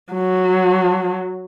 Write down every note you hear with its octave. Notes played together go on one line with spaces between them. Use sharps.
F#3